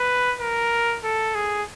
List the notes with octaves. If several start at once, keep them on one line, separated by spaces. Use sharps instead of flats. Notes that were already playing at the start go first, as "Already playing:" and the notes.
Already playing: B4
A#4
A4
G#4